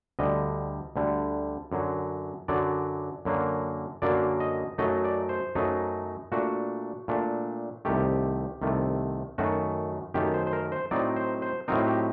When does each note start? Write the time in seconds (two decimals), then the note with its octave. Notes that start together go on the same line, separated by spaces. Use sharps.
0.19 D2 D3 G3 D#5
0.96 D2 D3 G3
1.72 F#2 D3 F#3
2.48 F#2 D3 F#3 D5
3.25 F#2 D3 F#3 A#3
4.02 F#2 D3 F#3 A#3 D5
4.40 D#5
4.78 F#2 F#3 A3 D#4 D#5
5.04 D5
5.29 C5
5.55 F#2 F#3 A3 D#4
6.32 A#2 A3 D4 F#4
7.08 A#2 A3 D4
7.85 C2 C3 D#3 A3 G4
8.62 C2 C3 D#3 A3
9.38 F#2 D#3 A3 F#4
10.14 F#2 D#3 A3 G4
10.34 C5
10.47 C5
10.53 A#4
10.72 C5
10.91 A2 F#3 C4 D#4 D5
11.16 C5
11.42 C5
11.68 A2 F#3 C4 D#4 A#4
11.87 G4